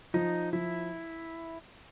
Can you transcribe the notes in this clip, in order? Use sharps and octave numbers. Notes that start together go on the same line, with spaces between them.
F3 D#4
F3 E4